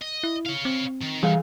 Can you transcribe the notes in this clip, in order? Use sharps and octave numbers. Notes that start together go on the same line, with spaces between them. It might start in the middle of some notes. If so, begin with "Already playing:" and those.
D#5
E4
C#5 F5
C4
D#3
E3 G3 G#4 F5